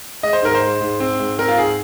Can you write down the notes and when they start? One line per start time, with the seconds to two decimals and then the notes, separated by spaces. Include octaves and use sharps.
0.23 G#3 D#5
0.33 C5
0.42 G#2 A#4
0.55 C5
0.62 G#3
0.81 G#2
1.00 C4
1.19 G#2
1.38 C4 A#4
1.48 F4
1.58 G#2 G#4